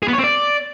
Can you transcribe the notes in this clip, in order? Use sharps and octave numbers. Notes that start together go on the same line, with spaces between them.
G#4
B3
C#5
C4
D5